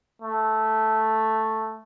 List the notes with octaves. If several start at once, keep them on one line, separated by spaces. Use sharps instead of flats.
A3